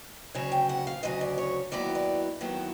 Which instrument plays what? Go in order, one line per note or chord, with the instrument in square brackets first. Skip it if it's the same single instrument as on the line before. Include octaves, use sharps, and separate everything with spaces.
[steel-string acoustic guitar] D2 C#3 F#3 C#5
G5
F#5
F5
D2 C#3 F#3 D#5
D5
C#5
D#2 D#3 F#3 B3 E4 D5
D5
D#2 D#3 F#3 B3 E4